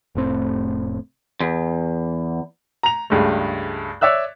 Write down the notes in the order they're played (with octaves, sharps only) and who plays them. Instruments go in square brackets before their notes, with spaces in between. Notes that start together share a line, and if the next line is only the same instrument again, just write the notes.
[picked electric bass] F1 A2 C4
[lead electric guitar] E2
[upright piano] A#5 F7
C#2 G2 G#3 A3
C#5 D5 E5 E6 F#6